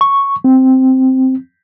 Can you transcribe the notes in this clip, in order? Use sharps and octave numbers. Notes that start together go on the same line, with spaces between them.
C#6
C4